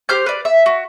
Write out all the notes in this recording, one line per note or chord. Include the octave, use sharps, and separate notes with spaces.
G4 C5 F6 G6
B4 D5
E5
F#4